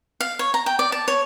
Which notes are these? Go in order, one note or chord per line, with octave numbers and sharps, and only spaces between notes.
F5
C#5
A#5
G5
D5
A5
C#5